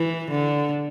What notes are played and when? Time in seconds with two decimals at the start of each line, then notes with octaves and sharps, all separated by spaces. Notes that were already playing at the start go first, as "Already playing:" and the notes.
Already playing: E3
0.31 D3